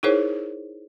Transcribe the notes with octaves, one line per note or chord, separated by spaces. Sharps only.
D#4 E4 G#4 A#4 C5 C#5